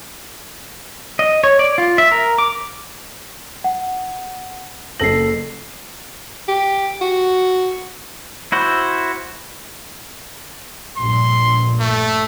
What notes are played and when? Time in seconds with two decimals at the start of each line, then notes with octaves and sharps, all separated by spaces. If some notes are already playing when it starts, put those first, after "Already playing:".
1.19 D#5
1.44 C#5
1.59 D5
1.78 F4
1.98 E5
2.12 A#4
2.38 D6
3.64 F#5
4.99 F#1 A4 A#6 C7 F#7
6.48 G4
7.01 F#4
8.52 E4 F#4 C5
10.97 A#1 G2 A#2 C6
11.80 A3